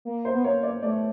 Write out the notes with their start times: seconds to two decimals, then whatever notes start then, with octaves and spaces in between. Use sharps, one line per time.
0.05 A#3
0.25 C5
0.34 B3
0.44 A#3 C#5
0.63 D5
0.83 A3 D5